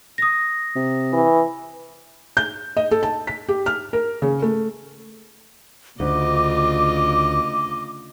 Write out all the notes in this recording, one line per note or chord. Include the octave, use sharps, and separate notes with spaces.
D#6 A#6
C3
E3
G6
D#5
A4
A5
B6
G4
F6
A#4
C#3
A3
D2 C#3 F4 D#5 D6